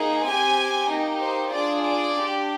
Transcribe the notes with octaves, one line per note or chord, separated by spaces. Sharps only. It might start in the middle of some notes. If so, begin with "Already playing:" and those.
Already playing: A#3 D#4 G#4
C4 G4 G#5
A#3 D#4 G4
C5
D4 F4 G#4 D5
D5
D4 G4